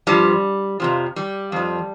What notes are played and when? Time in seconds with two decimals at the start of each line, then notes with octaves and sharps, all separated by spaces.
0.07 G2 F3 G3
0.80 F2 C3 F3
1.16 G3
1.52 F2 F3